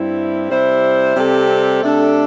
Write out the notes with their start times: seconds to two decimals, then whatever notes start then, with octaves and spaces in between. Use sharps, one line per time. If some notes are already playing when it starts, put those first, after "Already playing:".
Already playing: G2 G3 C4 E4
0.49 C3 G3 E4 C5
1.15 C3 G3 C4 A4
1.82 C3 A3 D4 A4